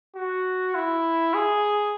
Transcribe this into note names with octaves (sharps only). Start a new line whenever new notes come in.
F#4
E4
G#4